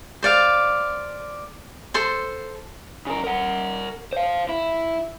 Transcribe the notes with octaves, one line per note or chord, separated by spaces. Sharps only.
C5 D5 F5
A4 C5 C6
C#3 A#4
A#4 F#5
C5 F5
E4